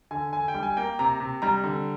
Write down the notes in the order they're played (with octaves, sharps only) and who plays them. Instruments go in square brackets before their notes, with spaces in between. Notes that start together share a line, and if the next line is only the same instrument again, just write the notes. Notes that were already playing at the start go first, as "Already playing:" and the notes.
[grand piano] D3 G#5
D3 G#5
G5
G3
G#5
A#3 G5
C3 A#5
C3
G3 A#5
D3